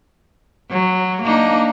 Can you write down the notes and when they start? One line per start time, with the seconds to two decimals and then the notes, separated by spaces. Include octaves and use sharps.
0.71 F#3
1.23 A#3 D4 D#4